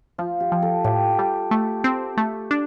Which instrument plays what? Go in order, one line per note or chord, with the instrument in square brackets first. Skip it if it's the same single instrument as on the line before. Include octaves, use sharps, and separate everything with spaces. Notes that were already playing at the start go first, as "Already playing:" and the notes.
[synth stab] F3 [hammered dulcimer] F4
[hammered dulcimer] G4
[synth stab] F3
[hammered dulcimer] A4
[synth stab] A2 [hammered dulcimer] G4
[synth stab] G3
A3
C4
A3
D4